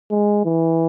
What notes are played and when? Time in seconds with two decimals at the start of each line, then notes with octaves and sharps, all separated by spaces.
0.11 G#3
0.45 E3